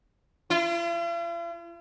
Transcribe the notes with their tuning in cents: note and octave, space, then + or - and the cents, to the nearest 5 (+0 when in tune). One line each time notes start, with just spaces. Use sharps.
F4 -45